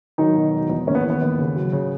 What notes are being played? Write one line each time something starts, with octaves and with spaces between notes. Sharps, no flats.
D#3 F#3 D#4
B2
E1
E2
D#2 C#4
B3
E3
B3
D#2
C#3
F#3
C#3